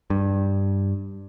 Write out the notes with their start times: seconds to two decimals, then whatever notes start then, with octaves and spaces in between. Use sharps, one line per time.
0.10 G2